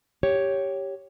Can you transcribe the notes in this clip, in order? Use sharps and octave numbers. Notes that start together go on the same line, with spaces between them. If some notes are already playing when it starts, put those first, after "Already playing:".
G4 C#5